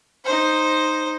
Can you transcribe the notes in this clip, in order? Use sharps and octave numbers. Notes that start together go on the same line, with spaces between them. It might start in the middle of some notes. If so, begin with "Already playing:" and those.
D#4 C5